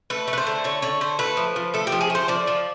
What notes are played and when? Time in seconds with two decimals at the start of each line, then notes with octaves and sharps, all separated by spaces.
0.10 A3 B4
0.28 A3
0.33 B4
0.38 C5
0.46 D3
0.64 A3 C#5
0.82 D3 C#5
1.01 A3 C5
1.19 A3 B4
1.37 F3
1.56 F3
1.74 A3 A4
1.87 G4
1.92 F3
2.01 G#4
2.10 A3 C5
2.28 F3 D5
2.47 F3